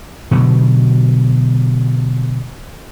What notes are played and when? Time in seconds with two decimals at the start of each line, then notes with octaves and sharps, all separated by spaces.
0.31 B2 D3 F#3